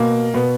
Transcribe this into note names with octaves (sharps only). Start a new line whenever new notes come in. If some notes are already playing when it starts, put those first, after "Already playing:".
Already playing: B2 A#3
B2 B3